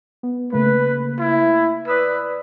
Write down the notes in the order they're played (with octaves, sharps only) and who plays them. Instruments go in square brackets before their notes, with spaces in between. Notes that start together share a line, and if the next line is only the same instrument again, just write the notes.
[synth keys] B3
[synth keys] C#3 A3 A#3 [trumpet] B4
[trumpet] E4
[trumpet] B4 [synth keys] D5 D#6 E6